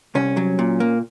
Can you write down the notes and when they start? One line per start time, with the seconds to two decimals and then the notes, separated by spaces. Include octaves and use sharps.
0.15 C2 C#4
0.37 F#3
0.59 A#2
0.80 A#3